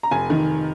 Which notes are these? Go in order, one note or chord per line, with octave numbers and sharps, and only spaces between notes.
A#5
F1 G#5
D#3